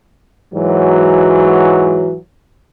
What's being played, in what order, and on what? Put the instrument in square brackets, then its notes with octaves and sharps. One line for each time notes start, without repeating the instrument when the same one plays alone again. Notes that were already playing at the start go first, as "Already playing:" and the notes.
[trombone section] G#2 E3 F#3